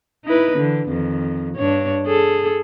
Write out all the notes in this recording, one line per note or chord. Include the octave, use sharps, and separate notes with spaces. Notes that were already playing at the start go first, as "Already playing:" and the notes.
D#4 E4 B4
D3 E3
F2 D#3
G2 D4 C#5
G#4 A4